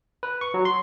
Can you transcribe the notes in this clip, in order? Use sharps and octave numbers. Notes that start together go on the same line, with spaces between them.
B4
C#6
F#3
C6